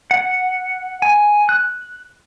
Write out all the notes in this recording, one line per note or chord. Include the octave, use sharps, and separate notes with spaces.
F#5
G#5
F#6